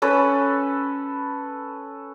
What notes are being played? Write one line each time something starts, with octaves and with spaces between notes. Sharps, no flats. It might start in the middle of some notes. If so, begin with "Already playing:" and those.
C#4 A4 B4